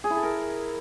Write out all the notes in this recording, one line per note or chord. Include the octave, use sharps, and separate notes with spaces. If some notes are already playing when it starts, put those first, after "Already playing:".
G#4
E4
A4
A#4